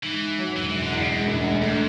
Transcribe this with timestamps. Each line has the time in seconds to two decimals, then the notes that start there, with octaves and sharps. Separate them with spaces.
0.03 G#2 E3
0.21 G#2
0.39 F#3
0.56 E1 E3
0.69 E3
0.74 E1
0.83 D3
0.92 E2 C#3
1.09 F#2 G#3
1.27 E1
1.44 D2
1.62 G#2 A3